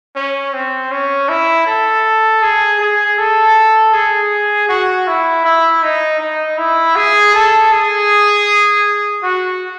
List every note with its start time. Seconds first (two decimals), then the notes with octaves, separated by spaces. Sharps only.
0.16 C#4
0.53 C4
0.91 C#4
1.29 E4
1.67 A4
2.42 G#4
2.80 G#4
3.18 A4
3.93 G#4
4.69 F#4
5.07 E4
5.45 E4
5.83 D#4
6.21 D#4
6.58 E4
6.96 G#4
7.34 A4
7.72 G#4
9.23 F#4